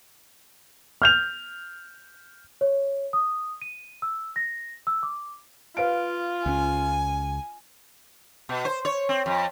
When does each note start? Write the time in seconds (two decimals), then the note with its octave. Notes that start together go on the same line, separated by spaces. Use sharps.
1.02 F6 G6 F7
2.61 C#5
3.13 D#6
3.62 D#7
4.02 E6
4.36 A#6
4.87 E6
5.03 D6
5.77 F4 B4 F5 D7
6.46 C#2 C#4 G#5
8.49 B2
8.65 C5
8.85 C#5
9.09 C4
9.26 F2